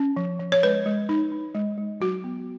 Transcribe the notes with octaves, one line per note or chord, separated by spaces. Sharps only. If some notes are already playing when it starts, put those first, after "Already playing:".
Already playing: C#4
F3
F3
C#5
G#3 B4
G#3
D#4
D#4
G#3
G#3
F#3 F#4
B3